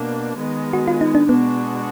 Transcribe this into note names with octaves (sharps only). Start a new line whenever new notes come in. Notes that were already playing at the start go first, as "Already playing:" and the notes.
Already playing: B2 A#3 D4
D#3 G#3 B3
F#4
F4
D#4
D4
B2 G#3 B3 D4 F#4